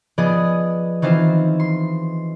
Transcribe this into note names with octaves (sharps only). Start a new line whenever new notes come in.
F3 B3 G#4 D5 D#5
D#3 E3 C4 F4 C5
C6